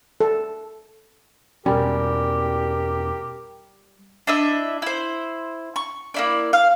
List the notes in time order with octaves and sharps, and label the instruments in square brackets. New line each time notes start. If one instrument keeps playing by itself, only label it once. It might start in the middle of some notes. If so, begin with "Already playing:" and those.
[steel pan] A4
[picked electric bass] E2 B2 C#4 [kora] G3 [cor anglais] G4 [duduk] A#4
[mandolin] D4 E4 D#5 E5
E4 C5
C#6
A#3 E4 D5
F5